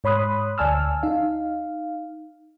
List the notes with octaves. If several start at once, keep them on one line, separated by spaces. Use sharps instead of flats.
G#2 C#5 B5 C6 D#6 F#6
D2 D5 G#5 A5 E6 F6
D#4 F5